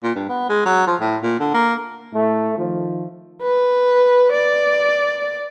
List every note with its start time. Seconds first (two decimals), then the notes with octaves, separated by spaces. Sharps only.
0.03 A#2
0.16 G2
0.29 B3
0.50 G#3
0.66 F#3
0.87 F3
1.01 A2
1.23 A#2
1.40 D3
1.54 A#3
2.14 A2 A3
2.58 D#3 F3
3.42 B4
4.32 D5